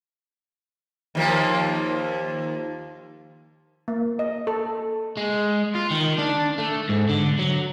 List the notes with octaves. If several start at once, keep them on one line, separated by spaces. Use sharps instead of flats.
D#2 F3 A#3
A#3
D#5
A4
G#3
F4
D#3
D4
A3
G#2
D3
F#3